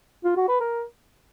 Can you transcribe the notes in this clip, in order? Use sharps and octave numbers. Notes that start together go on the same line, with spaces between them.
F4
F#4
B4
A#4